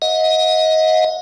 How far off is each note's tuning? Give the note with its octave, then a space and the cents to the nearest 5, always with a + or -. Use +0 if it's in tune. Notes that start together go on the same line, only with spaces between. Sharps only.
D#5 +25 F#5 -35